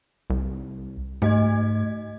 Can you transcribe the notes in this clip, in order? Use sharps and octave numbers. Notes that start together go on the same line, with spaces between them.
C2
G#2 A3 D#5 G#6